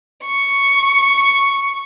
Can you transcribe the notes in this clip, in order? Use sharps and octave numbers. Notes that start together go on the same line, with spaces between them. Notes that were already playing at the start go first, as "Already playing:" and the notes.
C#6